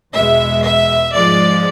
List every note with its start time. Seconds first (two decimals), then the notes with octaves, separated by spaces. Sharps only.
0.14 E2 B2 G#3 E5
0.65 E5
1.14 G#2 F3 G#3 D5